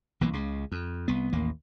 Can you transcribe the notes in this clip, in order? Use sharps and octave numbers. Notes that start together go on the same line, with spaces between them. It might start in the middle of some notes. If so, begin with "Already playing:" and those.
B1 E3 A#3
C#2 C#3
F2
C2 B3
A1 D#2 A#3